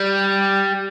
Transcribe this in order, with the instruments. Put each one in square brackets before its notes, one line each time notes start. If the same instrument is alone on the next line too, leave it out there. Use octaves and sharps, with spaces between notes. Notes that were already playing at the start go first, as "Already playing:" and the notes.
Already playing: [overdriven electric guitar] G3